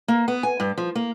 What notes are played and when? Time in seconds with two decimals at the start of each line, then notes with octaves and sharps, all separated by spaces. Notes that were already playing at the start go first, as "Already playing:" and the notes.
0.08 A#3
0.28 B3
0.43 G#5
0.60 G2
0.78 F3
0.95 A#3